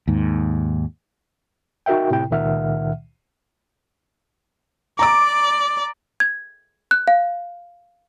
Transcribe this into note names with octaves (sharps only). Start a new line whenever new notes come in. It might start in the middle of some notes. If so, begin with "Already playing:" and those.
D#2 G#2
D#4 F#4 A#4 E5 G5
A2 C3 E4 G5
C#2 A#2 D#3 E5 F#5 F6
D5 A#5 D6
G#6
F#6
F5